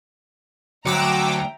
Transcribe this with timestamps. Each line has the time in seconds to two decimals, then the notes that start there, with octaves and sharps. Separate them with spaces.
0.85 D2 F#3 E5 F#5 G5 A#5 D6 E6